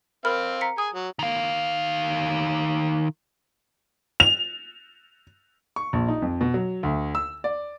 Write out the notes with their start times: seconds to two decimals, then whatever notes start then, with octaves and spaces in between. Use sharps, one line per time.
0.25 C4 A#4 F5 B5 F6
0.61 A#5 B6 C#7
0.78 G#4 G#5 D#6
0.93 F#3
1.19 D#3 F5
4.20 F7
5.76 C#6
5.93 A#1
6.08 D#4
6.22 F2
6.41 B2
6.54 F#3
6.83 D2
7.15 E6
7.44 D5